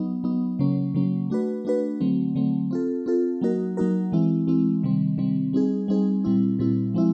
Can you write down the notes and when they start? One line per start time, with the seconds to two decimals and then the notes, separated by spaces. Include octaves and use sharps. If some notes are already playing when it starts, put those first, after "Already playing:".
Already playing: F#3 B3 D#4
0.24 F#3 B3 D#4
0.59 C#3 F#3 A#3 C#4
0.94 C#3 F#3 A#3 C#4
1.30 A3 D4 F#4 B4
1.65 A3 D4 F#4 B4
2.00 D3 F#3 A3 C4
2.35 D3 F#3 A3 C4
2.71 C4 F4 A4
3.06 C4 F4 A4
3.41 F#3 A#3 D#4 F#4 A#4
3.77 F#3 A#3 D#4 F#4 A#4
4.12 E3 G#3 C4 E4
4.47 E3 G#3 C4 E4
4.83 C3 D#3 G3 C4
5.18 C3 D#3 G3 C4
5.53 G3 C4 D#4 G#4
5.88 G3 C4 D#4 G#4
6.24 A#2 G3 C4 E4
6.59 A#2 G3 C4 E4
6.94 F3 G#3 C4 E4